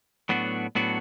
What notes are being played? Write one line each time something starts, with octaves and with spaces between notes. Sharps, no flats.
A2 F#3 B3 D4 F#4
A2 F#3 B3 D4 F#4